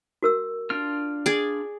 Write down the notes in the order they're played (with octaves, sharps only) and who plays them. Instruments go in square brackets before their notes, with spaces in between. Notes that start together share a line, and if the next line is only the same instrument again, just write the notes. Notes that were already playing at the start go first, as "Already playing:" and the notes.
[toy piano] F#4 A#4 E6
[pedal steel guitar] D4 F4 F6
[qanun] G#4 D5